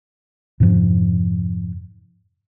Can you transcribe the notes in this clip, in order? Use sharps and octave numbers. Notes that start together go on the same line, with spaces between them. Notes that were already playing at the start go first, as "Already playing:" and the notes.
F2 G#2 C3 F3